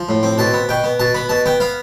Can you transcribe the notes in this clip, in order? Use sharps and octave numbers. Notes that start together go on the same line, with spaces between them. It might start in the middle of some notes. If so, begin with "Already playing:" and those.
Already playing: F3
A2
C4
B2 A5
B3
B2 G5
B3
B2 A5
B3 B5
B2 A5
B3 G5
B3 F5